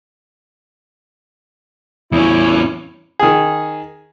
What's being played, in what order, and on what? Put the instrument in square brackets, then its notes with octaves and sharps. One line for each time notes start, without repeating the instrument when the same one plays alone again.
[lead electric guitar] E2 C#4 [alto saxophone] E4
[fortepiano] D#3 G#4